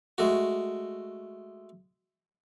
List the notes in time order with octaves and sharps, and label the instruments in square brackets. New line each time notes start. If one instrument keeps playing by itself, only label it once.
[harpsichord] G#3 A3 F#4